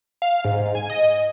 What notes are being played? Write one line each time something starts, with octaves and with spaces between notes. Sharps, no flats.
F5
G#2
G#5
D#5